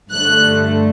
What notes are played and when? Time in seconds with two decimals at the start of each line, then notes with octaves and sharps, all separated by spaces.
0.11 G2 D3 A3 F#6